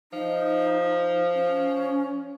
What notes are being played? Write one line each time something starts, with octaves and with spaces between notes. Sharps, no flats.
F3 D#4
C#4